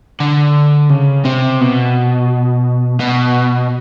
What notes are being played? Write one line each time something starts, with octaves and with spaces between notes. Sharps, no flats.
D3
C#3
C3
B2
B2